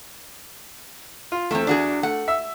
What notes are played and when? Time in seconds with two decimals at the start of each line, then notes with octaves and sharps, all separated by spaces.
1.32 F4
1.51 E2 A3 C4
1.67 D4 F#4 G#4
2.03 A3 F#5
2.28 E5 E6